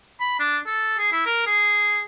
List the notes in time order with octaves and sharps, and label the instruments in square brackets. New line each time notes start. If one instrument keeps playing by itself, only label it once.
[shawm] B5
D4
A4
G#4
E4
A#4
G#4